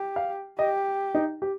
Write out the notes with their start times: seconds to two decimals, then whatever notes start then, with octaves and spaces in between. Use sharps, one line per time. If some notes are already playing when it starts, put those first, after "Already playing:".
Already playing: G4
0.16 F5
0.58 G4 D#5
1.15 D#4
1.42 G4